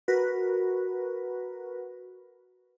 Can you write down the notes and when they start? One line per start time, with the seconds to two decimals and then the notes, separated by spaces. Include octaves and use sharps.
0.08 F#4 A#4 B4